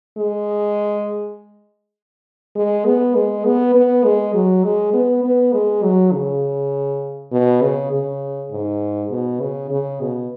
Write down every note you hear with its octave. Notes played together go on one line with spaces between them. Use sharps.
G#3
G#3
B3
G#3
B3
B3
G#3
F#3
G#3
B3
B3
G#3
F#3
C#3
B2
C#3
C#3
G#2
B2
C#3
C#3
B2